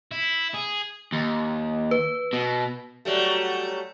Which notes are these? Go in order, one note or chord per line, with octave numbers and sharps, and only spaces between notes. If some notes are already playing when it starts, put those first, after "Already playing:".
E4
G#4
D#2
B4
B2
F#3 G3 A3